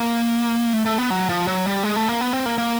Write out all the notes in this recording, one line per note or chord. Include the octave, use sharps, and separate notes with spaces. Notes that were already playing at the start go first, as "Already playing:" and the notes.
Already playing: A#3
A3
A3
B3
F#3
F3
F#3
G3
G#3
A3
A#3
B3
C4
A#3
A#3